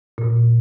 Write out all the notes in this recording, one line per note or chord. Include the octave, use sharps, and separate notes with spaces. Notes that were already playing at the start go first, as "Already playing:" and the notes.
A#2